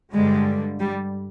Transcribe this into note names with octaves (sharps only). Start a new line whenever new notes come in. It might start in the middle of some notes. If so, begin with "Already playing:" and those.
G2 D3 G3 G#3
G3